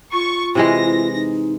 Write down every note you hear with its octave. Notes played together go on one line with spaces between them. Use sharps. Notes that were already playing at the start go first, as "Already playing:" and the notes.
F4 C#6
C3 E3 G#3 E4 A#6
D#4